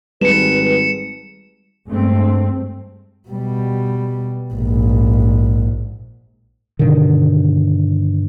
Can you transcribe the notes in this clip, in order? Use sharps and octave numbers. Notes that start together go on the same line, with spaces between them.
G#1 G3 B4 C#7 E7
G2 G#3 A3 C4
B2 G3
A#1 G#2
G2 B2 D3 D#3